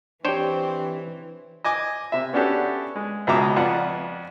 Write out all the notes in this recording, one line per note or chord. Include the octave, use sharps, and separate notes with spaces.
E3 C4 D4 G4 C5 C#5 G5
D#5 G#5 D6
C3 E5
B3 C#4 D4 F#4 G4 A4
G#3
C#2 B2 G#3 E5 A#5 D6
F2 F4 B4 D5 F#5